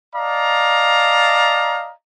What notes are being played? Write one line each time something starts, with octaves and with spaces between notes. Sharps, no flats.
D5 D#5 F5 A5 A#5